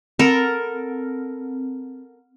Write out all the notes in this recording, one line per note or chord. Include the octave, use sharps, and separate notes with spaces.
C4 A4 A#4